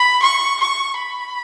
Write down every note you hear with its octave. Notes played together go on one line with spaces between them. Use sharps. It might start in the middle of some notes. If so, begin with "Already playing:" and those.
Already playing: B5
C#6
C#6
B5